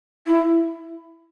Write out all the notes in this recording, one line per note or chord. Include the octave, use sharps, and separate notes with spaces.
E4